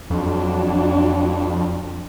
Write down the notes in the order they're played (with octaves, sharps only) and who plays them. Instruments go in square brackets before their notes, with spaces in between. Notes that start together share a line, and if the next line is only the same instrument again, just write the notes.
[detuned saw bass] F2 [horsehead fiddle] F#3 D4